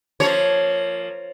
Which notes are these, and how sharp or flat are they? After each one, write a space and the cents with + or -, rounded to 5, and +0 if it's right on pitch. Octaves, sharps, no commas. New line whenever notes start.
F3 +0 A#3 -20 C#5 +0